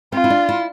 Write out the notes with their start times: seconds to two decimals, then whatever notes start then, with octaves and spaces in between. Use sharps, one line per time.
0.12 C4 F4
0.24 E4
0.30 D4
0.49 E4